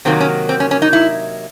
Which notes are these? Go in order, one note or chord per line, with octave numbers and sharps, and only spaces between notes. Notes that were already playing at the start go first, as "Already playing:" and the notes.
C3 D#3 F#3 A#3 C4
C#4
C4
C#4
C#4
D#4
E4